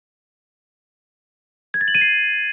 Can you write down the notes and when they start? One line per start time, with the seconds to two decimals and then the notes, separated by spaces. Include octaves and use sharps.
1.74 G#6
1.81 A6
1.88 F#7
1.95 D#7
2.01 C7